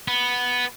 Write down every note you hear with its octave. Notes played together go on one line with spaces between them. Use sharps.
B3